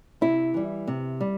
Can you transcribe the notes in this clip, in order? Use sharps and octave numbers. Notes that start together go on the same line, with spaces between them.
C3 E4
E3 G3
C3
G3